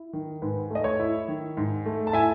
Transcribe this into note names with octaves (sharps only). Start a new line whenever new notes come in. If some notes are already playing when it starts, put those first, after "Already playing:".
Already playing: E4
D#3
G#2 B4
A3 D#5
C#5
E4
D#3
G#2
A3
A5
E4 E5 G#5